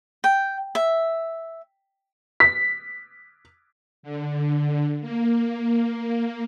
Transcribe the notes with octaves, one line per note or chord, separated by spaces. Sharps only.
G5
E5
B6
D3
A#3